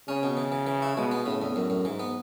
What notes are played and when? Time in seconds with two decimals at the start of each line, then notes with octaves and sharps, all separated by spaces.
0.08 C#3 C#4
0.23 B2
0.37 E3
0.52 E3
0.67 E3
0.82 E4
0.97 B2 G#3
1.11 B3
1.26 A2 C#3
1.42 E2
1.56 F#2 A2
1.70 F#2
1.85 G#2 E3
2.00 B3